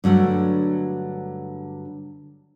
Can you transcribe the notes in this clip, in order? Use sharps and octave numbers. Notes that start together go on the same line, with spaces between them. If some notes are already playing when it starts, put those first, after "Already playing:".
G2 D3 F#3 A3